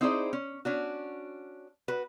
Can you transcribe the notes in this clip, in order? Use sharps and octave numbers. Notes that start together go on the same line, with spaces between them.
C4 D#4 E4 G#4 C5 D5
C#4
C#4 D4 F#4
F#4 B4